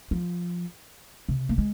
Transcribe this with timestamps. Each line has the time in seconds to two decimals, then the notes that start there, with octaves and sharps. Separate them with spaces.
0.11 F3
1.29 C3
1.49 A#3
1.58 G#3